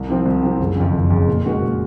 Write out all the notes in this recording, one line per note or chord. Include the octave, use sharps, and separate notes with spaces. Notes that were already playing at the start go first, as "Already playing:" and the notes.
Already playing: C2
C3 F3 C4
C2
C3 F3 C4
F#1
F2 C#3
F#1
F2 C#3
A#2
G#3 C#4 F#4 A#4
A#2